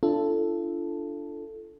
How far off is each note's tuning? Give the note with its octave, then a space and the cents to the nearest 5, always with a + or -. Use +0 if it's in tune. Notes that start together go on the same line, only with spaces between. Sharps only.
D4 +0 F4 -35 A4 +0